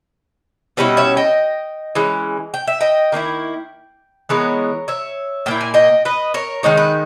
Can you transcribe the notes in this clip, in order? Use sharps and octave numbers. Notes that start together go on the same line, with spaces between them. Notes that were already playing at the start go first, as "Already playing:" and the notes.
B2 G3 C#4 E4 B4 D#5
C#5 E5
D#5 G5
E3 G#3 C#4
G5
E5
D#5 G5
D#3 A#3 C#4 E4
E3 G#3 B3 A#4 C#5
C#5 E5
A#2 A#3 E4 G5
G#5
D#5 G5
B4 D#5
A#4 C#5
D#3 G#3 D#4 C#5
B4